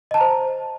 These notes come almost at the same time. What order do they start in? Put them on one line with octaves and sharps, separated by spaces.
D#5 A5 A#5 C5